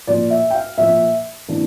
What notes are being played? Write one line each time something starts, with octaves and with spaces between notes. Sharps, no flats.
A#2 F3 A#3 D5
E5
G5
F5
A#2 F3 A#3 E5
C3 E3 A#3 D4